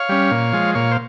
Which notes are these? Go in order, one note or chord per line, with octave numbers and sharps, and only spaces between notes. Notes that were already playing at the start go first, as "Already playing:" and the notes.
Already playing: C#5 F5
G3 C#4
A#2
F3 G#3
A#2 C#5 F5
C5